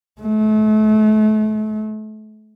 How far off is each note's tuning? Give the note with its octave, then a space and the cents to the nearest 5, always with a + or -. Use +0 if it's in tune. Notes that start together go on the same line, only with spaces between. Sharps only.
A3 -35